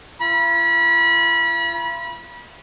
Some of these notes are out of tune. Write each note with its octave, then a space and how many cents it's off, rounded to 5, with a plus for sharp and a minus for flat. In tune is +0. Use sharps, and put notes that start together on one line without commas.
F4 -45 B5 -30